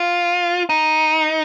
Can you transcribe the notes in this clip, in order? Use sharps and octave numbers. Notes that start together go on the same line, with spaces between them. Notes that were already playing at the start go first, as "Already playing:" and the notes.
Already playing: F4
D#4